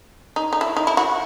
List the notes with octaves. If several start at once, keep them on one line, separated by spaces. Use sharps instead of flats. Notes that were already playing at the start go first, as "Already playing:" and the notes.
D#4
D#4
E4
D#4
E4
F#4